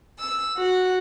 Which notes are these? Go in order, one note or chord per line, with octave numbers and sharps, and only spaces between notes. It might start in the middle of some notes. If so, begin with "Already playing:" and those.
E6
F#4